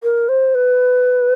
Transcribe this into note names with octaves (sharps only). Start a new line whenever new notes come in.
A#4
C5
B4